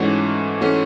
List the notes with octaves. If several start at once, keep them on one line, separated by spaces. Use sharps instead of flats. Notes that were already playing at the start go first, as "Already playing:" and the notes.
Already playing: G#2 E3 A3 C#4 F#4
E3 A3 C#4 F#4